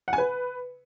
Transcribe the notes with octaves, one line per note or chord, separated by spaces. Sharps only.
F#5
G#5
B4